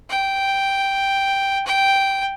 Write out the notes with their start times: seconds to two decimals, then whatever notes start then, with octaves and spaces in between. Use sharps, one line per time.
0.10 G5
1.66 G5